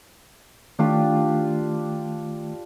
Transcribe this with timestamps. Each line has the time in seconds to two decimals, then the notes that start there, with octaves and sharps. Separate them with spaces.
0.79 D#3 A3 D4 F4 G4